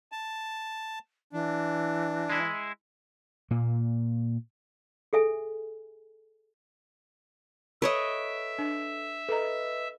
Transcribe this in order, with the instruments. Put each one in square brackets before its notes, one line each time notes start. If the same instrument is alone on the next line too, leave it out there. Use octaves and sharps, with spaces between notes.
[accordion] A5
[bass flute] E3 [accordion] D4
[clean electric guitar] G#3 E4
[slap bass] A#2 A#3
[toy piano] G#4 A4 E5 G#5
[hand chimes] A4 B6 D7 [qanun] B4 C#5 D#5 [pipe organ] E5
[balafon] D4
[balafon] A4 A#5 [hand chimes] B4 D#5